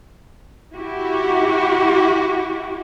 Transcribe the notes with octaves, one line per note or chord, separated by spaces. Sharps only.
E4 F#4 G4